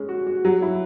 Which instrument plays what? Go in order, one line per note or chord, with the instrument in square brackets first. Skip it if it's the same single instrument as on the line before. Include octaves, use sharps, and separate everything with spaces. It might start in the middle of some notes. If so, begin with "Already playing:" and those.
Already playing: [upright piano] G#3 C#4
F#4
F#4
F#3
E4